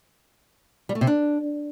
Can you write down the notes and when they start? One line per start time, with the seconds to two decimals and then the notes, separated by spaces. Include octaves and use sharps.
0.89 G3
0.95 A3
1.01 C3
1.07 D4